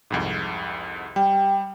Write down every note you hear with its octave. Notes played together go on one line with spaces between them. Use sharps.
C2 F2 G#2
G3 G5